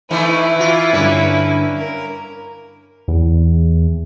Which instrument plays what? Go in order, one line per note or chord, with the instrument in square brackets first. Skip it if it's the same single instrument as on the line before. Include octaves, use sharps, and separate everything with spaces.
[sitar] E3 A3 D#4 [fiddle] E4 B4
[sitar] E3 F4
[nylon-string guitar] G2 D3 D4 [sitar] A#3 C#4
[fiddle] A#4
[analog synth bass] E2